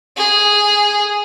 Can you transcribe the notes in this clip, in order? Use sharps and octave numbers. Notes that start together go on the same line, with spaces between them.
G#4